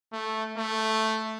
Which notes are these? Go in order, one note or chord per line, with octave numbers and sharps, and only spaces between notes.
A3
A3